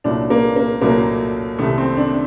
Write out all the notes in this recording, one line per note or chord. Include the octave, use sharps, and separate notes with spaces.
C2 A#2 F#3 A3 D4
A#3
A#3
C2 A#2 F#3 A3 A#3
C2 C3 D#3 A3
C4
D4